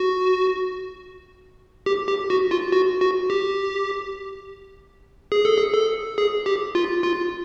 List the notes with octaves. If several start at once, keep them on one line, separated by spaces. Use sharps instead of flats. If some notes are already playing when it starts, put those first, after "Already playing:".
Already playing: F#4
G4
G4
F#4
F4
F#4
F#4
G4
G#4
A4
G#4
A4
G#4
G4
F4
F4